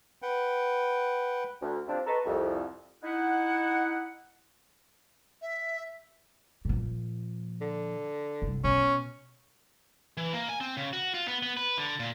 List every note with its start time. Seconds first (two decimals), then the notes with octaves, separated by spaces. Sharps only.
0.22 B4 F#5 G5
1.61 D2
1.88 F3 G3 C4 D4
2.07 A4 B4 D#5 A5 A#5 C#6
2.25 C2 F2
3.04 D#4 E4 F#5
5.42 E5
6.65 A#2 F3
7.61 D3
8.42 C2
8.64 B2 C#4
10.17 E3
10.33 A#3
10.49 G#5
10.61 C4
10.77 C#3
10.93 F#4
11.14 F4
11.28 B3
11.42 B3
11.57 B4
11.78 D3
12.00 A#2